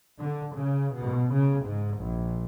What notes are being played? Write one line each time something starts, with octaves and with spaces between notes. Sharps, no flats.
D3
C#3
B2
C#3
G#2
A#1